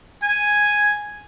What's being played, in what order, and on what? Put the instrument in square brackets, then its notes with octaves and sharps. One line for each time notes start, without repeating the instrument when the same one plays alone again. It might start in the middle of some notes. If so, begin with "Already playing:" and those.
[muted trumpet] G#5